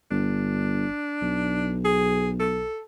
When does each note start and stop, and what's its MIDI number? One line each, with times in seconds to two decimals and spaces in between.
0.11 0.86 31
0.11 1.77 62
1.22 2.67 35
1.85 2.30 68
2.40 2.82 69